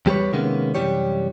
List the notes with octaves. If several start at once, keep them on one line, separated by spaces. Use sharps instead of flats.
E2 G3 G4 G#4 B4 C#5
C3 D#3 G#3 A#3 B3 C#4
F#2 C3 E3 G3 G4 C#5